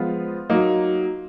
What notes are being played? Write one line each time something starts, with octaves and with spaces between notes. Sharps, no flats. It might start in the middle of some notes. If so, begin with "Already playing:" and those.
Already playing: F3 G#3 B3 F4
F#3 A#3 D#4